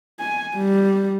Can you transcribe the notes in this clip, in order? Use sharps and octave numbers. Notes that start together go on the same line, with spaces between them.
G#5
G3